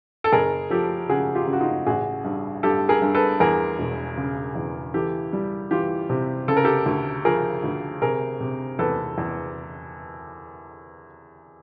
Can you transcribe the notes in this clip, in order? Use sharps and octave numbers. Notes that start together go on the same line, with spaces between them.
A4
F#1 G#4 A#4
F3 G4 A4
C#3 F#4 G#4
F4 G4
C#3
F#4
D#4 F4
A1 F#4 G#4
G2
G2 G4 A4
G#4 A#4
G2
A4 B4
E2 G#4 A#4
E1
C#3
E2
E3 G4 A4
G3
E3 F4 G4
C3
C#3 A4
A#4
G4 A4
D2
F3 G#4 A#4
D2
C3 G#4 A#4
C3
E2 A4 B4
E2